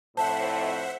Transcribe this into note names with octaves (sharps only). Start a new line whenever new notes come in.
F2 A2 C5 E5 F#5 A5